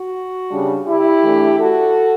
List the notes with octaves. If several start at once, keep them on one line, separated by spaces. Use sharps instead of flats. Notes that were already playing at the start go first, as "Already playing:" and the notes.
Already playing: F#4
C#3 G3 D4
E4 G4
E3 A3 D4
F#4 A4